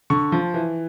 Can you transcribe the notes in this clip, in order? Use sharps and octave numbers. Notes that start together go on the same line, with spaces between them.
D3 C#6
F3
E3